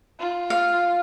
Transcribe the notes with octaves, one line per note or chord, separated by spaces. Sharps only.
F4
F5